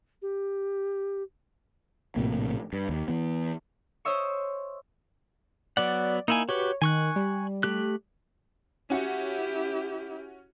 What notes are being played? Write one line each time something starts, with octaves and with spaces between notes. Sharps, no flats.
G4
A#1 A2 C3 A#3
G2
D#2
E3 B3
C5 C#5 D#5 E5 C#6
F#3 B3 D5 F#5
A#3 D#4 E4 G#5
F#4 G4 B4 C#5
D#3 G#5 C#6 F#6
G3
A3 G4 F#6
C#4 E4 F#4 G4 C#7